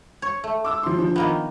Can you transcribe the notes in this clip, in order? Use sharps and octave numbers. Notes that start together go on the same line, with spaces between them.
C#5
A3
D6 E6
F3 C6
F3 D4
D#3 A#3 B3